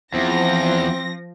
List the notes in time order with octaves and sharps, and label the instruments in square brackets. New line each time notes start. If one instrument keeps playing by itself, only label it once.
[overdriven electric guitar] E2 [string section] F3 A#6 [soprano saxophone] C4